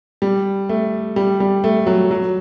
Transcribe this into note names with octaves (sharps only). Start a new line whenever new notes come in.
G3
A3
G3
G3
A3
F#3
F#3